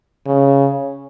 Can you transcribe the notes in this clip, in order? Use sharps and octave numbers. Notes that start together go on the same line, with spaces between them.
C#3